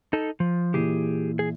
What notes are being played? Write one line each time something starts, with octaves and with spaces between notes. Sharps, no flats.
D#4 A4
F3
A#2 E3 G4 G#4
G#4